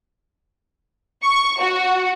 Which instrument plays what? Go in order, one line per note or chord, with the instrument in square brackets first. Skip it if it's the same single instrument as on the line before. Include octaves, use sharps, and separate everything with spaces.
[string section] C#6
F#4